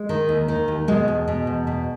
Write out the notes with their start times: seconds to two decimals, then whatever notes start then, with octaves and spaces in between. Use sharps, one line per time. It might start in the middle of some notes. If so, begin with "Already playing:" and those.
Already playing: G#3
0.09 D#3
0.29 D#2
0.48 D#3
0.68 D#2
0.88 B2 G#3
1.08 E2
1.28 B2
1.47 E2
1.67 B2